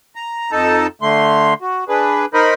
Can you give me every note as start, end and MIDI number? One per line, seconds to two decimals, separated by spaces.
0.16 0.51 82
0.52 0.87 41
0.52 0.87 63
0.52 0.87 69
0.52 0.87 81
1.02 1.54 50
1.02 1.54 57
1.02 1.54 84
1.62 1.84 66
1.89 2.26 62
1.89 2.26 68
1.89 2.26 71
2.34 2.54 63
2.34 2.54 70
2.34 2.54 72
2.34 2.54 75
2.34 2.54 83